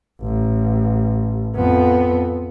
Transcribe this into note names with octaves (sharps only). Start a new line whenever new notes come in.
A1
F2 B3